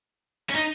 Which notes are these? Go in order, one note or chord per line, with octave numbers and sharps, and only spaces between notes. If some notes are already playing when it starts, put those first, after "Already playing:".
C#4
D#4